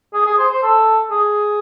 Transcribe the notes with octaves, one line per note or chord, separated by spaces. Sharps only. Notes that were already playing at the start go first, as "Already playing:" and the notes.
G#4
G#4
C5
C5
A4
G#4